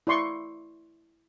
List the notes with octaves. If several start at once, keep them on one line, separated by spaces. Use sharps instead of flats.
E4 D5 C6 C#6